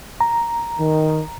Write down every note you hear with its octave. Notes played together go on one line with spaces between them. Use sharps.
A#5
D#3